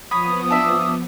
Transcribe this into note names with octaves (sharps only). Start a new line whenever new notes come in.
F3 B3 C#5 B5 D#6
D4 E5